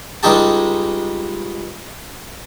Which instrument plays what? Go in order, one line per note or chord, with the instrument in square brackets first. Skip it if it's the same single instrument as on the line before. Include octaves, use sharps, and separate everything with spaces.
[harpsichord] C#2 G3 G#3 D#4 G4 A5